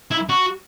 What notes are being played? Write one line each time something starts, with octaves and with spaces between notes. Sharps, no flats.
E4
F#4